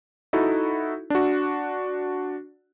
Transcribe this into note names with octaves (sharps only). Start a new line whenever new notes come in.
D#4 E4 F#4 A4
D4 F#4